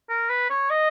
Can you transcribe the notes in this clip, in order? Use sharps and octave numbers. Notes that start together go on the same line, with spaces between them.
A#4
B4
C#5
D#5